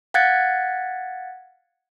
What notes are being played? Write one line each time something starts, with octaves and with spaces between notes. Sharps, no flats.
F5 F#5 F#6 G#6 A6 C#7